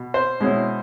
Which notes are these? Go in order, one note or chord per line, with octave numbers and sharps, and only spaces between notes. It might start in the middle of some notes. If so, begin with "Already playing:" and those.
Already playing: B2
C5
B2 G#3 C#4 E4